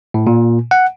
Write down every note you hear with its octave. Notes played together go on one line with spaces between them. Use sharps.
A2
A#2
F#5